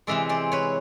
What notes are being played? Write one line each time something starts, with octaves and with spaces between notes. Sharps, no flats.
C3 E3 G#3 D5 E5
C5 D5
B4 C#5